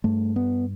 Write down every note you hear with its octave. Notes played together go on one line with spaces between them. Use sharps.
G2 A3
B3